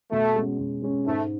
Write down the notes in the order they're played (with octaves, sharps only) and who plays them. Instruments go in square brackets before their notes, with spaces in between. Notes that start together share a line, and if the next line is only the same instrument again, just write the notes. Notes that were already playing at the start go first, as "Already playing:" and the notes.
[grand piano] B2 [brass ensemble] A3
[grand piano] G#3 C#4
B2
G#3 C#4
[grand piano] G#2 [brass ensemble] A3